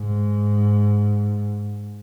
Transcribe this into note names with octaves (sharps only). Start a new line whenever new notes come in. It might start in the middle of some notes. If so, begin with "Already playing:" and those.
Already playing: G#2